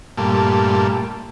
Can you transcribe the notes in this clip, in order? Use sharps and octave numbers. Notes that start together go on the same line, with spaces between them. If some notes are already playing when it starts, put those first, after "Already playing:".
G2 A#2 A3